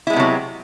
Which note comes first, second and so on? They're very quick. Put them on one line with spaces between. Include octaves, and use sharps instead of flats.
E4 G#3 B3 C3 F#3